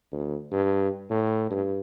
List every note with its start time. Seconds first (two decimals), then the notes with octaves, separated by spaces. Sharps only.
0.12 D2
0.52 G2
1.10 A2
1.50 G2